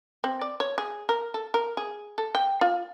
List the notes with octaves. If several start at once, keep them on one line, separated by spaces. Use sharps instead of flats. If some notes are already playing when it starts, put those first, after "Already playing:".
C4
D5
C#5
G#4
A#4
A4
A#4
G#4
A4
G5
F4